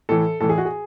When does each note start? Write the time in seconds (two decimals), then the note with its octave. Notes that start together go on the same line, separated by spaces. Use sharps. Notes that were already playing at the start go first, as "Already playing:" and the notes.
0.09 A2 E3 A4
0.41 A2 E3 A4
0.49 G#4
0.58 F#4
0.65 G#4